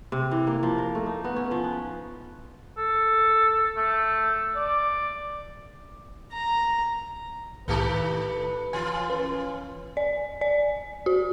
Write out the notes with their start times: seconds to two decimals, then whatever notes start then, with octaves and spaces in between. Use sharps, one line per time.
0.12 C3
0.31 E3
0.47 A#3
0.63 F3
0.78 A#4
0.95 A3
1.06 D#4
1.24 B3
1.36 C#4
1.51 F3
1.64 B4
2.77 A4
3.77 A3
4.56 D5
6.33 A#5
7.68 C2 A2 D#3 A3 G4 B4 A5
8.73 E3 F4 G#5
9.10 C#4 B4
9.97 D5
10.41 D5
11.06 F#4